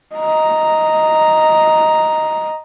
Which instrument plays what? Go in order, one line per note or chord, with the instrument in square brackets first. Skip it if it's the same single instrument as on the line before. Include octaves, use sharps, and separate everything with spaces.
[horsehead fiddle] D#5 A#5